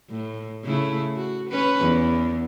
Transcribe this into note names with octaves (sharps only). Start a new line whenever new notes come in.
A2
C#3 A3 E4
F#4
C#4 B4
E2